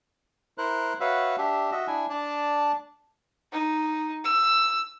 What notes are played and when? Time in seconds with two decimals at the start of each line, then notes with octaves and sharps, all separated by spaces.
0.58 E4 A#4 C5 F#6
1.00 F#4 B4 C#5 E5 F5
1.38 D4 G4 E5
1.72 F#4 D#5 E5
1.87 D4 E4 G#5
2.10 D4 D5 A5
3.52 D#4
4.24 E6